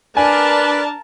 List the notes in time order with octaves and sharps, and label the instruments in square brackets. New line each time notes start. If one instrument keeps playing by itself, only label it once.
[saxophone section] D4 [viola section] A#4 A5 [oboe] B4 [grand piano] G#5